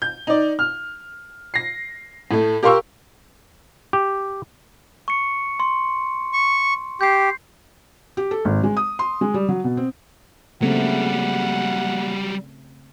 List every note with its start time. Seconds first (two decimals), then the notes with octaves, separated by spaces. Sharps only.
0.02 G6
0.27 D#4 D5
0.59 F6
1.54 A#6 C7
2.31 A2 A3
2.63 G4 A#4 F5 C6 C#6 E6
3.93 G4
5.08 C#6 C#7
5.60 C6
6.33 C#6
7.01 G4 G6 C7
8.17 G4
8.31 A4
8.45 G#1
8.64 G#3
8.77 D#6
8.99 C6
9.21 G#3
9.34 G3
9.49 F#3
9.64 B2
9.77 C4
10.62 C#3 F#3 G3 A3 A#3 C4 F#5